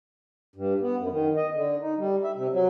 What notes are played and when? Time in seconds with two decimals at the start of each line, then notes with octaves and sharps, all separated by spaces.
0.55 G2
0.82 B3
0.97 F#2
1.10 D#3
1.36 D#5
1.54 D3
1.81 D#4
1.98 G3
2.23 E5
2.36 C3
2.53 F#3